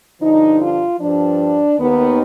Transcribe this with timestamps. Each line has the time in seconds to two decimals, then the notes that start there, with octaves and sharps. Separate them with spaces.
0.21 G2 D3 F3 D#4
0.60 F4
1.00 G2 F3 D4
1.79 D#2 D#3 B3